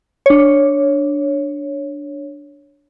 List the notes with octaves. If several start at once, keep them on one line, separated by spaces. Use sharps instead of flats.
D4 C#5